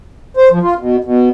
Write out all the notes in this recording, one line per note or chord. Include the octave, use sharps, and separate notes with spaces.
C5
F3
F4
B2
B2